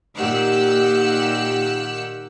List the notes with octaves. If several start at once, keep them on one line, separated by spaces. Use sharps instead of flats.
A#2 D#3 G4 F#5 E6 F#6